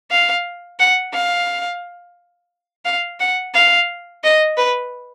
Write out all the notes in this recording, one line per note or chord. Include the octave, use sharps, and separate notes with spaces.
F5
F#5
F5
F5
F#5
F5
D#5
B4